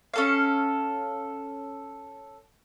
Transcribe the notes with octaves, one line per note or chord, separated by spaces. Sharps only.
C#4 A4 F5